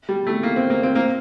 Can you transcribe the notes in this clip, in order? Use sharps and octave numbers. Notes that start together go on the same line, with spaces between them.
G3
A3
A#3
C4
A#3
C4
A#3